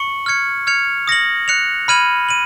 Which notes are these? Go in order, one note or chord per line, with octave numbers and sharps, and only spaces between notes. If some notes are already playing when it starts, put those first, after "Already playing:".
Already playing: C#6 C#7 F#7
F6 G#6 C#7
F6 G#6 C#7 F7
D#6 A#6 C#7 F#7
F#6 C#7 F7
B5 F6 G#6 D#7 F#7
D#7 F#7